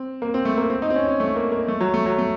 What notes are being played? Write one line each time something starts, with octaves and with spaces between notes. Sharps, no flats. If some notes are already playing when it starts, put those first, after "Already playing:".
Already playing: C4
A#3
C4
A3
A#3
C4
D#4
C4
C#4
C#4
A3
A#3
A#3
A3
F#3
A3
F#3
A3